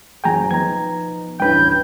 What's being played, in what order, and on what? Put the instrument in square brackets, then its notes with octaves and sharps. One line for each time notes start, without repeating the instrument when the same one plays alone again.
[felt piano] F#1 F#3 G#4 [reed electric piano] G5 G#5 A#5
[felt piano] F3 B3 D#4 [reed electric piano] A#5 G#6
[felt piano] A1 D2 G2 [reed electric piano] B4 G5 [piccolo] G6